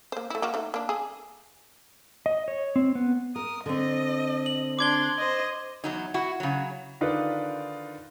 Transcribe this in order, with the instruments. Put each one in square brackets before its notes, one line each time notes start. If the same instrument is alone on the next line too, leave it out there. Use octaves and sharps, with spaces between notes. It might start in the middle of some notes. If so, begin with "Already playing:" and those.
[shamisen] A#3 C5
A3 E4
A#3 F#4 F5
A3 D#4
A#3 D4
G#4 A4
[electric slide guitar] D#5
C#5
C4
B3
[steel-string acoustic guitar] A#4 [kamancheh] D#6
[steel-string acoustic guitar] D3 C4 [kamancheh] D#5
[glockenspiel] F#7
[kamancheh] D4 C6 [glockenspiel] D6 G#6 G7
[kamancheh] C5 D#5
[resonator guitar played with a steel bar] E2 F#3 D#4
E4 F#4
C#3 F#3
[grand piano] D3 D#3 D#4 F4 B4 D5